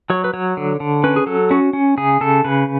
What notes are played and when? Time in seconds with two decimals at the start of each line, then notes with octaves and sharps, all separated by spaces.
0.10 F#3 C#5
0.24 B4
0.34 F#3 C#5
0.57 D3
0.80 D3
1.04 C#4 B4
1.16 G#4
1.26 F#3 A4
1.51 C#4 F#4
1.73 C#4
1.97 C#3 G#4
2.21 C#3 A4
2.44 C#3 B4